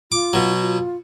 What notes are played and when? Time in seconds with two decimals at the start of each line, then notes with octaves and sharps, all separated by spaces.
0.12 F4 D6
0.33 B2 F#3
0.61 F4